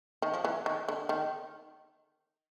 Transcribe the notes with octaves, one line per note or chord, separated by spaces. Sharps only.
D#3
F3
E3
D#3
D3
D#3